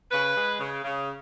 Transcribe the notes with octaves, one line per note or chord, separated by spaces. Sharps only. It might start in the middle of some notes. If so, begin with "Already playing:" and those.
C#3 B4
G#3
C#3
C#3